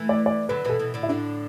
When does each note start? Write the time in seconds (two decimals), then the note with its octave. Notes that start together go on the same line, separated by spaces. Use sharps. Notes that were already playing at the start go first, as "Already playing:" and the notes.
Already playing: E3 A3
0.09 D5
0.26 D5
0.49 D3 F#3 B4
0.64 B2 E3 B4
0.69 A4
0.79 B2 E3
0.94 A2 D3
1.03 E4
1.09 A2 D3 D4